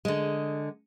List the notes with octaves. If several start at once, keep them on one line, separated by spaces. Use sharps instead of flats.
D3 G#3